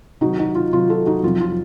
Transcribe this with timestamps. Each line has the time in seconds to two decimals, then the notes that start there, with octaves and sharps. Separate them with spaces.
0.21 C3 D#3 F#3 D#4 F#4
0.39 D#4 F#4
0.55 F4
0.72 C3 D#3 F#3 F4
0.90 F4 A4
1.06 D#4 F#4
1.23 F2 C3 F#3 C4 F4
1.41 F4